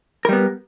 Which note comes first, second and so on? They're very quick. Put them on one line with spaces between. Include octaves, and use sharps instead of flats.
A#4 G3 B3